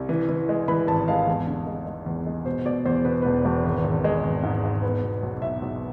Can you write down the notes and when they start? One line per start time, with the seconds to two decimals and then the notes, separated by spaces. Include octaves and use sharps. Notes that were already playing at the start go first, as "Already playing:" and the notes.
Already playing: C2
0.09 E3
0.29 E3
0.49 G#3
0.68 E3 B5
0.87 G#1 A5
1.08 G#3 F5
1.28 E2
1.47 D3
1.67 G#3
1.86 G#3
2.06 E2
2.26 G#3
2.46 B2 C5
2.65 B2 D5
2.86 E2 C5
3.05 B2 B4
3.22 E1 B4
3.45 E1
3.64 G#1
3.84 G#1
4.04 G#3
4.23 G#1
4.43 G#2
4.63 G#2
4.83 B3
5.03 B2
5.23 B1
5.42 B1 E5
5.62 B1